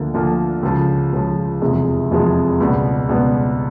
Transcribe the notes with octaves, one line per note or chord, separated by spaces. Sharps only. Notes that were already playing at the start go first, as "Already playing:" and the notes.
Already playing: D2 D3 F3 A#3
D2 D3 F3 A#3
C#2 C#3 F3
C#2 C#3 F3
F1 E2 C3 F3 G#3
F1 E2 C3 F3 G#3
C#2 B2 G3 B3
C#2 B2 G3 B3